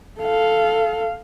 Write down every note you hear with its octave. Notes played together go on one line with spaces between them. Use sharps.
A4 F5